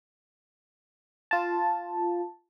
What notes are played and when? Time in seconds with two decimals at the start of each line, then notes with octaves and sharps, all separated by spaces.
1.31 F4 A5